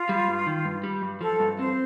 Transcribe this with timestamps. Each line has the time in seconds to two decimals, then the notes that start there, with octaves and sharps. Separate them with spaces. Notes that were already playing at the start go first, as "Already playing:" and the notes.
Already playing: F4
0.09 G3
0.28 G2
0.46 D#3
0.65 G2
0.83 G3
1.02 G2
1.21 F3 A4
1.40 G2
1.58 C4 C5